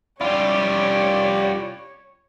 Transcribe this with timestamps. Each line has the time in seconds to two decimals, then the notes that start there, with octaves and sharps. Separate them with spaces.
0.21 G3 C#4 E4 F4 G4 C#5 D5